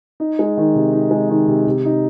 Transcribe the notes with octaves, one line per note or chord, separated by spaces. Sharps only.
D#4
G#3
D#3
C3
D#4
G#3
D#3
C3
C3
D#4